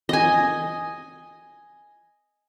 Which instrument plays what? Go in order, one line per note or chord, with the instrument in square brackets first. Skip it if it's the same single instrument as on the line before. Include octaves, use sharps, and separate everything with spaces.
[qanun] D#5 G#5